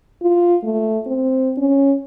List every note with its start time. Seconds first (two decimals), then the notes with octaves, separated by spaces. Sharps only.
0.22 F4
0.64 A3
1.06 C4
1.57 C#4